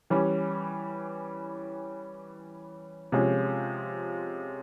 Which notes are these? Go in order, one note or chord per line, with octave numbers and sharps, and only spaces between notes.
E3 G3 C#4
C3 F3 G#3 C#4